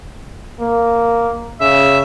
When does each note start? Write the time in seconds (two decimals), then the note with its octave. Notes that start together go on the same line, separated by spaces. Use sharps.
0.60 A#3
1.61 C#3 E5